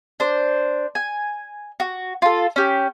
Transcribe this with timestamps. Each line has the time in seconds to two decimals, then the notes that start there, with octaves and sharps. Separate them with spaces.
0.20 D4 C5
0.95 G#5
1.80 F#4
2.22 F4 A4
2.56 C#4 G4